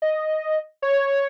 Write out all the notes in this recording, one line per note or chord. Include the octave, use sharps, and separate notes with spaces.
D#5
C#5